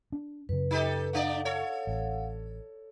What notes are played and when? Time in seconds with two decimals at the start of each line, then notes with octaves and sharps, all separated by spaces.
0.12 D4
0.49 F#2 C#3 B4
0.71 D#4 G4 A4
1.13 A3 D4 D5 F5 F#5
1.45 A4 C#5
1.87 A1